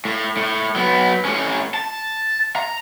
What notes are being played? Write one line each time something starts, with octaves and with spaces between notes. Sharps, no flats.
A2
A2
F#3 B3
A2 C#4
A5
A#5